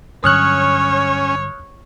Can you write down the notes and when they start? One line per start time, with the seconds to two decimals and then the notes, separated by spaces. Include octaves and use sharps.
0.24 G2 D3 F#3 C#4 C#5 D#6 F6 F#6